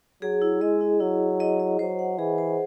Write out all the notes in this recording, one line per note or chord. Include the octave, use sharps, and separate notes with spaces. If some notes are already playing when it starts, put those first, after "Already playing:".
F#3 G#4
E4
G#3 D#5
E4
F#3 E4
E4
D#5
D#5
F#3 C5
F#5
E3 G#4
C5